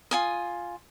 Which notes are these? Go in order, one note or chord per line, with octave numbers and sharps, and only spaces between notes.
F4 G#5 D#6